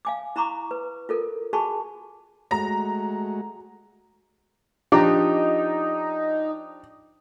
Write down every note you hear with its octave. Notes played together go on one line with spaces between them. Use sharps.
F5 G#5 D6
E4 A#5 B5 C#6 D6
B4
F4 A4 A#4
F#4 G#4 G#5 A5 B5 C#6
G#3 A3 F#4 A#5 A#6
F3 D4 D#4 G4